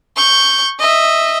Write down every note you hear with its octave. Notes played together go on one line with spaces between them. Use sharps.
C#6 G6
D#5 E5